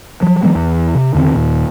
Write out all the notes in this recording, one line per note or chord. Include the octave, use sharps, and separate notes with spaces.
F3 F#3
E3 F#3 G#3 B3
E2
C3
E2 D3 D#3 C4
D#2 A#2